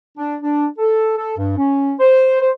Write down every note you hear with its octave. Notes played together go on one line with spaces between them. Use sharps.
D4
D4
A4
A4
G2
C#4
C5
C5